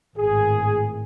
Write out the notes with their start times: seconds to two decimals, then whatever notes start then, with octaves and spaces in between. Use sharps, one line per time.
0.17 G#1 A2 G#4